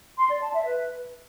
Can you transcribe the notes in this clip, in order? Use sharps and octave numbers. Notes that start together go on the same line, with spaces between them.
C6
D5
A5
E5
B4